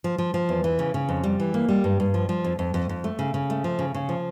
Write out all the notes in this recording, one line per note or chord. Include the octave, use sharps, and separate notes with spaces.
F3
F3
F3
E2
E3
C#3
C#3
F2
G3
E3
A#3
G3
G2
G2
F3
F3
F2
F2
F2
F2
A3
C#3
C#3
A3
F3
C#3
C#3
F3